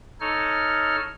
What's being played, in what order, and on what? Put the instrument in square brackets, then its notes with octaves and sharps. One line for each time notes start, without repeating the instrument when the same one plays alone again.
[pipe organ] D#4 A4 C#5 F6